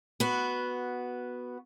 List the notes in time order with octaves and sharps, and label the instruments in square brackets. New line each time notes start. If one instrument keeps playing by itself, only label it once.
[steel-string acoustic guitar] B3 F#4